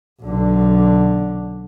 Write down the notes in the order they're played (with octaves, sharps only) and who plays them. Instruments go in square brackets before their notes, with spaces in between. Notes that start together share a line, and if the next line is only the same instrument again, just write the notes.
[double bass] B1 D3